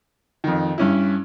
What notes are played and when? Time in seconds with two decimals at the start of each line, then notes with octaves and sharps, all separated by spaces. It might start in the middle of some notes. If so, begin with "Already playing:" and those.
0.44 F2 D#3
0.78 G2 C#4 E4